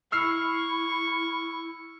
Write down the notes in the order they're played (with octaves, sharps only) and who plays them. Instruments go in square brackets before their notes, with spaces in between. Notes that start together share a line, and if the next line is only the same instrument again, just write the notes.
[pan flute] E4 [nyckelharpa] C#6 [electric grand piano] E6 F6 C7